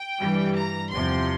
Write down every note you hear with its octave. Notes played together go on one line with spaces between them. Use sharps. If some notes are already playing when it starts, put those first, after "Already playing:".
Already playing: G5
G2 E3 G3
A#5
E2 C3 F3 C6